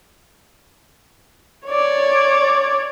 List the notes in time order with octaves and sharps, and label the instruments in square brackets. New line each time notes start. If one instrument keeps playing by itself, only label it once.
[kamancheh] C#5 D5